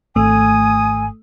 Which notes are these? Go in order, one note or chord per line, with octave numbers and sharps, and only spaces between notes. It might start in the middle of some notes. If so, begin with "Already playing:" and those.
G#1 A3 G#5 D#6